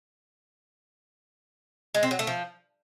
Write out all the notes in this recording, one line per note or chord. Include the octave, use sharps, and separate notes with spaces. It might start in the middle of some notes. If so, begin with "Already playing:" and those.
G#3
C4
F#3
A3
F3